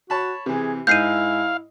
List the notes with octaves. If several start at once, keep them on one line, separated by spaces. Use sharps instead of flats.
F#4 C#5 A5 B5
C3 E3 G#4
G#2 E4 F5 G6 C7 D#7